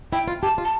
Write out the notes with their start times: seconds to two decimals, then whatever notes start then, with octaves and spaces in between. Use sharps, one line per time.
0.13 E4 G5
0.28 F4
0.42 G4 A5
0.58 F4
0.65 A5